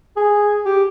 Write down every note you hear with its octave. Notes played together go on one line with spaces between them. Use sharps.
G#4
G4